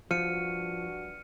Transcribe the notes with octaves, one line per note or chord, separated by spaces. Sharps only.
G2 F3 D4 F#4 F6 C#7 D#7